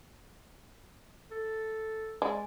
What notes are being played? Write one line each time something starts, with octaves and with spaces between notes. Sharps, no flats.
A4
G#3 D5